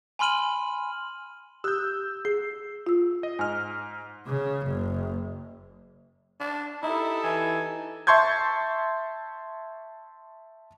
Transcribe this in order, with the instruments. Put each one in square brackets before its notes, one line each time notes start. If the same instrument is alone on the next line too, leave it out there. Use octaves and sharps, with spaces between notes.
[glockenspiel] G#5 B5 C6 F6 D#7 F#7
[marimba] G4 D#6 F#6 [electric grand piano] E6 G6
[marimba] G#4 [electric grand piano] C7
[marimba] F4 E6
[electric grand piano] D#5
[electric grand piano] G#2 F6 [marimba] G#5
[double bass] C#3
F#1
[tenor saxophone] D4
[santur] D#4 [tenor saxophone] E4 [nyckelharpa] G4 A4
[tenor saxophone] E3 [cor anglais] G#5
[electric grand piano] E5 A5 C6 C#6 G6 G#6